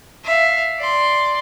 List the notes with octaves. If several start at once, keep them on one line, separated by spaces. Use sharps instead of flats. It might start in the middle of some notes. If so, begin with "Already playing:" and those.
E5 F5
D5 C6